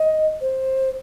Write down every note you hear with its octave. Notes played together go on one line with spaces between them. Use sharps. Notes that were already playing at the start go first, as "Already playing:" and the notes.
Already playing: D#5
C5